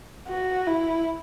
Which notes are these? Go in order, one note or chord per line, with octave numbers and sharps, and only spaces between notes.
F#4
E4